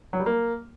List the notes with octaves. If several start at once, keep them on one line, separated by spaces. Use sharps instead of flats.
F#3
G3
A#3